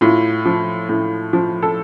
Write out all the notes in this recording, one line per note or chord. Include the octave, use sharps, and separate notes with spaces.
A2 F4
F3
A2
F3
A4